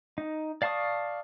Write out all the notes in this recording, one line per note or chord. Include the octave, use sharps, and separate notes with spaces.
D#4
D5 F5 A5 C#6 D#6